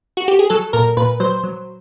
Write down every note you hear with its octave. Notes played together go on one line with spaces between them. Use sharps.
F#4
G4
G#4
F#3 A4
A#2 A#4
A#2 B4
F#3 C5
F#3